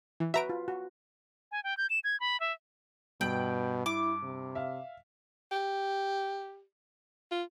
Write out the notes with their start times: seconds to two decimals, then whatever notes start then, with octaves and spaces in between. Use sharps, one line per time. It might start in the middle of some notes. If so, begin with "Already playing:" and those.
0.20 E3
0.34 F#4 B4 E5 A#5 D7
0.49 F4
0.68 F#4
1.52 G#5
1.64 G5
1.77 G6
1.90 E7
2.04 G#6
2.20 B5
2.40 E5
3.21 G2 B2 G5 D7 F#7
3.86 E4 D6
4.23 C3
4.55 E5 F5
5.52 G4
7.31 F4